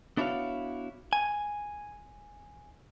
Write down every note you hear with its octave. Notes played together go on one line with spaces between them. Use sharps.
B3 D4 E4 F#4 C#5 F5
G#5